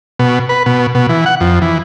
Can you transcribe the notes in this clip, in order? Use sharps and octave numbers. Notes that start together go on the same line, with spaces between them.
B2
B4
B2
B2
E3
F#5
F2
E3